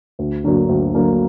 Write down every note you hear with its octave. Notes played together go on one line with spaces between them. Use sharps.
D2
D3 F#3 A#3 D4
D2
D3 F#3 A#3 D4